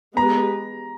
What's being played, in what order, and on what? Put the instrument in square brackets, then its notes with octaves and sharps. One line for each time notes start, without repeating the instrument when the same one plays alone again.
[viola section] G#3 B3 G4 B4 [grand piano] A#5